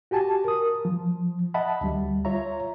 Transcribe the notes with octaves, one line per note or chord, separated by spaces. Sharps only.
F#4 G4 G#5 A5
A#4 D#6
F3
D#5 E5 F#5 A5 B5
D2 G3
F4 C#5 E5 A#5